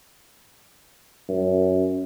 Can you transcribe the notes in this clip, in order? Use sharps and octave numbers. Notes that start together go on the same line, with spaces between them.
F#2